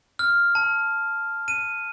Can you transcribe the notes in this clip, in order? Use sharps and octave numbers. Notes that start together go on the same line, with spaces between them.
F6
A5
D#7